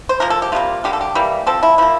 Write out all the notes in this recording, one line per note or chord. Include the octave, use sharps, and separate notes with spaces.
C5
F3 A#3 A#4
A4
G4
C3 G3 A#3 F4
D3 G3 A#3 G4
A4
G4
E3 G3 A#3
F3 C4 A4
E4
F3 A#3 E4